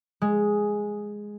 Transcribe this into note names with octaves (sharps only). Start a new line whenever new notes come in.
G#3